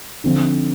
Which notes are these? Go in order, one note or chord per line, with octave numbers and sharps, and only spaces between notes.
D3 F3 C4